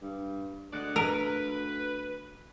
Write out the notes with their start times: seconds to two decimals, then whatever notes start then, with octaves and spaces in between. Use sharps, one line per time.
0.01 G2
0.73 D2 G#3 D5 F#5
0.96 A#4 B4